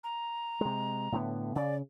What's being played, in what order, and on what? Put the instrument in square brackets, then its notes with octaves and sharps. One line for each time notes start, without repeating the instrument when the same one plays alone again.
[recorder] A#5
[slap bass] C3 G#3
A2 D3 B3
[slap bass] C#3 [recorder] D5